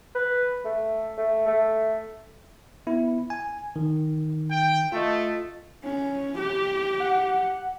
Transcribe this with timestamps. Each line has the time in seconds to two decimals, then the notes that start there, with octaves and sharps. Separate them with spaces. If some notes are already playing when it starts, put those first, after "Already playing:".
0.15 B4
0.65 A3
1.17 A3
1.47 A3
2.87 B3 E4
3.30 G#5
3.76 D#3
4.50 G5
4.92 A3 F4 D#5
5.84 C#4
6.39 G4
7.00 F#5